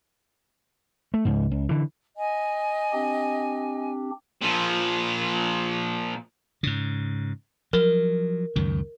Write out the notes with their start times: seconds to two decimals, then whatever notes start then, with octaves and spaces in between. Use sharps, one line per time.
1.14 A3
1.25 C#2 G#2
1.51 C#2
1.69 D3 E3
2.17 D#5 G#5
2.93 C4 D4 G4
4.42 A#2 F3
6.63 G#2 C#3
7.73 F3 F#3 A#4
8.56 C#2 F#2 D#3